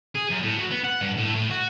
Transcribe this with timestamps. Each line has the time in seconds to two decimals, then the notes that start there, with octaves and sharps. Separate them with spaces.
0.15 G#4
0.30 F#2
0.42 A2
0.57 F#3
0.71 B3
0.84 F#5
1.01 G2
1.17 A2
1.35 A2
1.51 F#4